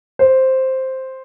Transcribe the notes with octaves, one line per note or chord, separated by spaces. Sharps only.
C5